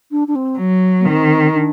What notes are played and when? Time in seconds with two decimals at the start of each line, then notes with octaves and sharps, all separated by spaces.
0.11 D4
0.28 D4
0.35 C4
0.58 F#3
1.00 A#3
1.06 D#3 C4
1.54 D4